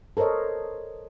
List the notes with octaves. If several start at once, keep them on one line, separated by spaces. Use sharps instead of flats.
A4 A#4 C5 C#5 D#5